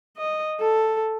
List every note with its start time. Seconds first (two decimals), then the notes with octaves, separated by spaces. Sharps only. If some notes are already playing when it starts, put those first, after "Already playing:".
0.17 D#5
0.60 A4